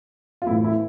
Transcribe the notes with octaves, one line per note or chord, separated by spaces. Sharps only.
F4
A2 E3 A3 E4
E4